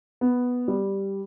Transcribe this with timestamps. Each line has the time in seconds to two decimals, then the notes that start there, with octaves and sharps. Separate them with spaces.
0.21 B3
0.68 G3